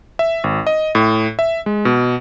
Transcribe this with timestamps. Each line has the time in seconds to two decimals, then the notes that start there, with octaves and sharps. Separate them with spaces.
0.19 E5
0.44 G#1
0.67 D#5
0.95 A2
1.39 E5
1.66 G#3
1.85 B2